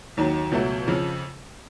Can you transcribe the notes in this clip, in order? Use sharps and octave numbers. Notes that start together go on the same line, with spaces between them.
D#2 D#3 F#3
C#2 B2 F#3 A3
F2 C#3 F3